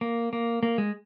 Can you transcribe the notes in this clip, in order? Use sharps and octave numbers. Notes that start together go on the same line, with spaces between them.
A#3
A#3
A#3
G#3